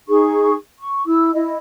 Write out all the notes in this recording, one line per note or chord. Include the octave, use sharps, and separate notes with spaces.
D#4 G#4 C#6
C#6
E4 E6
E4 D#5